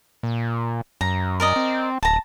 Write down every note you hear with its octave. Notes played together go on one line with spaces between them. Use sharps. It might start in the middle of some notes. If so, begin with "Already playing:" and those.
A#2
F#2 A#5
A#4 D5 D#5
C4
D1 A5 A#5